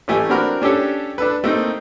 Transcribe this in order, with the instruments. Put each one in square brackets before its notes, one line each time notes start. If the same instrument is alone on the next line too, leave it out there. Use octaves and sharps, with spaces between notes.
[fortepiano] A1 E3 A3 G4 G#5
C4 D4 F#4 A#4 B5 F6
C#4 D4 G4 A4 C#5
D4 A4 B4
A3 A#3 C4 D#4